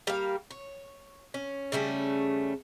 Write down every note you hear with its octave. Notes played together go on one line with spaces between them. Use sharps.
G3 A#3 F5
C#5
C#4
C#3 G3 A3 C#4